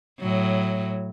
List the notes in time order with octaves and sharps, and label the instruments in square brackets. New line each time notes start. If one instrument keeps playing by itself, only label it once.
[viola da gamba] A2 F#3